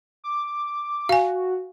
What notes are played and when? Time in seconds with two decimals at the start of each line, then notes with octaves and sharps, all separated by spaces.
0.24 D6
1.09 F#4 F5 G#5